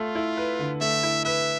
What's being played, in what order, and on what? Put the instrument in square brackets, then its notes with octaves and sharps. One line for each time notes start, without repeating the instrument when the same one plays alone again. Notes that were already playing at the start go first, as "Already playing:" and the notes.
Already playing: [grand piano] A3 [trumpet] F4
[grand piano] E4
B4
D3
[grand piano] A3 [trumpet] E5
[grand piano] E4
[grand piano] B4 [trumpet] E5